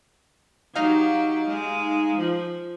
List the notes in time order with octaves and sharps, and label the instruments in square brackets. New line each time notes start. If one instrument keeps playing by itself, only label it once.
[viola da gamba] F#3 G4 [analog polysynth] D#4 F5
[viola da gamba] G#3
F3